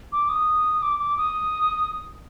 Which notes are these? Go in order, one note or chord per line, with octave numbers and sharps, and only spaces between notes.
D6
D#6
D6
D6
D#6